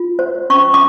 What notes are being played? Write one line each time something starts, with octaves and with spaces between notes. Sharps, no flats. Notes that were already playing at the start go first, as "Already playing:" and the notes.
Already playing: F4
C5
C#4 C#6
D6